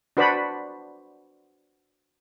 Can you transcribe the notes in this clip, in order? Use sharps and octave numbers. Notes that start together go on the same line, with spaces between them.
D4 F#4 B4 C5 D5 B5